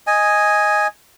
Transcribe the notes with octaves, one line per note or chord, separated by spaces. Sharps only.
D#5 G#5